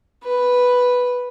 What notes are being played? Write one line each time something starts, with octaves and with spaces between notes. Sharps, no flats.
B4